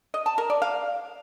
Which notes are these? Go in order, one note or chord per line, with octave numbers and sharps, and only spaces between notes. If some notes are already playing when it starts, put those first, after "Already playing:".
D#5
A5
A#4
D5
F5